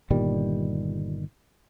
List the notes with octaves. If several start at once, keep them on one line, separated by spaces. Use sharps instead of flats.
G1 A#2 D#3 G3